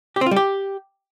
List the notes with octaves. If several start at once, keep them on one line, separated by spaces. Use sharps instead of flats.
G4
C4
F4
G3
G4